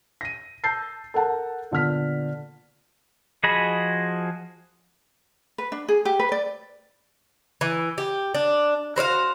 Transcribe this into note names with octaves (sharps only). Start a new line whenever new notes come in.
A#6 D#7
A5 E6 G6 A6 C7
A4 A#4 F#5 A5
A#2 D3 B3 F6 B6
F3 F#4 G#4 D#5 B5
B4
D4
G#4
G4
B4
D5
E3
G4
D4
F#4 C5 C#5 F5